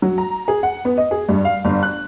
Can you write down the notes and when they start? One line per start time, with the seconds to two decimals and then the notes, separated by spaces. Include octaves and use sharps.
0.02 F#3
0.18 A#5
0.48 G#4
0.63 F#5
0.85 B3
0.97 D#5
1.11 G#4
1.29 G2
1.45 F5
1.65 G1
1.83 F#6